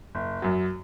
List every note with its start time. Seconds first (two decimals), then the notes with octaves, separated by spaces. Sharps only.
0.15 F#1
0.42 F#2 F#3